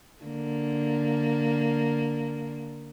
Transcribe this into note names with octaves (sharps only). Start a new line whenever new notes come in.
D3 A#3